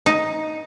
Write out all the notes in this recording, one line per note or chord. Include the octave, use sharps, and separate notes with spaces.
D#4